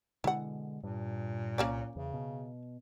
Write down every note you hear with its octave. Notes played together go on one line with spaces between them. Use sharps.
B2 D3 G#3 E4 F#5
G2 A#2
C2 A#3 C#4 D5
E2 C#3
B2